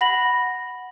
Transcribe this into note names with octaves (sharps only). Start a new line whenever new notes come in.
F#5 B5 A#6 F#7